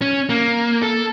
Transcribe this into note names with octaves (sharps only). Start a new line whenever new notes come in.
C#4
A#3
A4